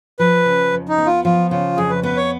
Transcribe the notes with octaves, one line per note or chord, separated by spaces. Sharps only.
F3 B4
C#3
F2
D#4
B3
F4
F3 F4
C#3 F4
F2 G#4
B4
B3 B4
C#5